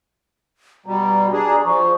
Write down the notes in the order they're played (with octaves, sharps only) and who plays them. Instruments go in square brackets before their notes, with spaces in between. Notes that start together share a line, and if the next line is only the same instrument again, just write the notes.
[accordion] B2 G3 [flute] A#5
[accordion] D4 G#4
[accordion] F3 [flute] C#6